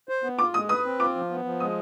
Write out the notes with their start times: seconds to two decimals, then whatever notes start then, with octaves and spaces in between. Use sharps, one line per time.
0.09 C5
0.24 B3
0.39 F4 D6
0.54 G#3 D#6
0.69 B4 D#6
0.85 C4
1.00 F4 D6
1.15 F3
1.30 B3
1.45 F3
1.60 G#3 D#6